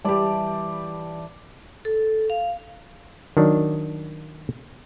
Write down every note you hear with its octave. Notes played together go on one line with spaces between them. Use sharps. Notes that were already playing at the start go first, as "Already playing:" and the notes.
E3 G3 G4 D5 A5
A4
F5
D#3 F#3 D4